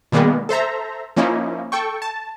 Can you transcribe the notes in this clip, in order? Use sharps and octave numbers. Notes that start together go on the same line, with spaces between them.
B2 D#3 G3 G#3 A#3 B3
A4 C5 E5 A#5
F3 A#3 C#4 D#4 E4
A4 G5 C#6
A5